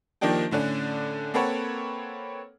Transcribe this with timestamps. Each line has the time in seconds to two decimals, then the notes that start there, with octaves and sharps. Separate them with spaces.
0.21 D#3 F3 A#3 D4 D#4 G4
0.51 A2 D3 C#4 D4
1.34 A#3 C4 A4 B4 C#5 F#5